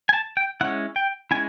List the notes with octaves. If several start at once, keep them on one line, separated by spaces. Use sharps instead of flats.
G#5
A5
G5
G#3 C#4 E4 F#5
G5
G#3 C#4 E4 G#5